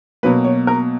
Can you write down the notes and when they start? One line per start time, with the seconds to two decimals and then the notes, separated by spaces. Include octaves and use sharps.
0.23 B2 F#3 A#3 B4
0.44 C#5
0.67 A#4